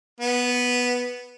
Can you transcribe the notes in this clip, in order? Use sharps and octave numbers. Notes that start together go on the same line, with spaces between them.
B3